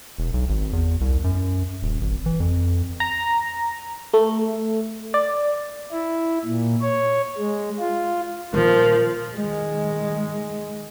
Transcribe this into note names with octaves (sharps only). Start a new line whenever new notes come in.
E1
B1
G#1
E2
C2
F#2
D#1
G#1
E3
F2
A#5
A3
D5
E4
A#2
C#5
G#3
F4
A#2 D#3 F3 G3 A#4
D#3 G#3